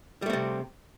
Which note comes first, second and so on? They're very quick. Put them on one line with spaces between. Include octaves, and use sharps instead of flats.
G3 A3 C4 C3